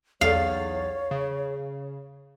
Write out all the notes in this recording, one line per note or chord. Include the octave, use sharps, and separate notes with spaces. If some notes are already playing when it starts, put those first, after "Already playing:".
B1 E2 C#5 F5 A6
C#3